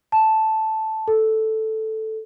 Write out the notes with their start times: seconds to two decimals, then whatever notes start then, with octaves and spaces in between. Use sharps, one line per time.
0.12 A5
1.08 A4